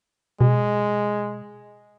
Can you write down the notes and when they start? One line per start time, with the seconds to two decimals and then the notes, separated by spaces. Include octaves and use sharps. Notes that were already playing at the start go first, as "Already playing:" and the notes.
0.41 B2 G#3